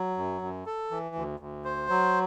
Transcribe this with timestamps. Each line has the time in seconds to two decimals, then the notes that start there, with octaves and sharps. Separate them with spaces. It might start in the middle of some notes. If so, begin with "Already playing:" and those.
Already playing: F#3
0.17 F#2
0.41 F#2
0.66 A4
0.91 E3
1.15 D2
1.40 D2
1.65 C5
1.89 F#3